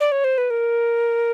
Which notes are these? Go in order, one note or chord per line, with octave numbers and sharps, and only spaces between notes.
D5
C#5
C5
B4
A#4